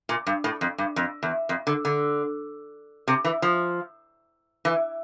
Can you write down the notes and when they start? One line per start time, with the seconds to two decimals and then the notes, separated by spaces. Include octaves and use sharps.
0.09 A#2
0.27 G2
0.44 A2
0.61 F2
0.78 G2
0.96 F2
1.23 E2
1.49 F2
1.67 D3
1.85 D3
3.08 C3
3.25 E3
3.42 F3
4.65 E3